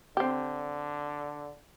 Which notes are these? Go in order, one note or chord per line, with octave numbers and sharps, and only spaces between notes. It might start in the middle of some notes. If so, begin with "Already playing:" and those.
D3 C4 G4